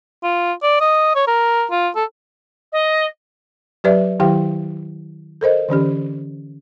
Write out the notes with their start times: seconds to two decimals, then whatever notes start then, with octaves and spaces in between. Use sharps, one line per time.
0.24 F4
0.63 D5
0.81 D#5
1.15 C#5
1.28 A#4
1.71 F4
1.96 A4
2.72 D#5
3.84 F#3 G4 B4 D5 E5
4.20 D#3 F#3 E4 G4 F5 G5
5.41 A4 A#4 C5 D#5
5.68 D3 E3 C#4 G4